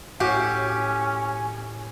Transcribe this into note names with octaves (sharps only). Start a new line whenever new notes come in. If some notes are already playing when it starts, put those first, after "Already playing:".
A2 C#4 F#4 G4 G#5